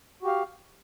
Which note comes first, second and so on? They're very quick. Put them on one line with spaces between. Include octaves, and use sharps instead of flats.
F#4 G4 F5